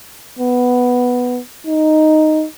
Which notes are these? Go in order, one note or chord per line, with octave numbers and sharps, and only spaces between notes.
B3
D#4